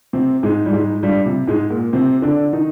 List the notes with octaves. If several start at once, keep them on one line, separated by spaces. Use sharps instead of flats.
C3 C4
G#2 G#3
G3
G#2 G#3
G2 G3
C3
G#2 G#3
A#2 A#3
C3 C4
D3 D4
D#3 D#4